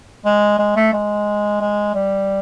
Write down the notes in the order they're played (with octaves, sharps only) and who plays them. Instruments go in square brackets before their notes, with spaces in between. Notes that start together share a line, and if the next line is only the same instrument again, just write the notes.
[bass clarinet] G#3
G#3
A3
G#3
G#3
G3